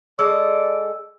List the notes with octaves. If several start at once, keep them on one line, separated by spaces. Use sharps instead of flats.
G#3 A4 D5 D#5 E6